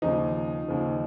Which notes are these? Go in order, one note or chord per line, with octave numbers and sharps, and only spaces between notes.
D#2 C#3 F3 D#4
D#2 C#3 F3